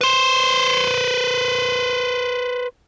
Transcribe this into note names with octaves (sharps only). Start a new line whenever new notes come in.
B4 C5